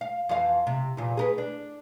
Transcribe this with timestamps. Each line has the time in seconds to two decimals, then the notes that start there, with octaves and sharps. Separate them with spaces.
0.01 F5
0.29 F2 E3 F5
0.67 C3
0.97 E2 A#2
1.17 G#4 A#4 B4
1.38 D4